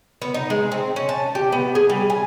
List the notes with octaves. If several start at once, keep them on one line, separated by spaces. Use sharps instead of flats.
B3
D#4
G#3
C4
C#4
A5
G4
B3
G#4
G3
G#5